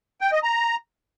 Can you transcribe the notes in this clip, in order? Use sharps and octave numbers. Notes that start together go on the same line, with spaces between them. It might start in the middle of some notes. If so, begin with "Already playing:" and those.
G5
D#5
A#5